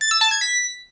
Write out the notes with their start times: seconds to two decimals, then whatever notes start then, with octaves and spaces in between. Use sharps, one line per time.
0.01 A6
0.11 E6
0.21 A5
0.31 G#6
0.41 B6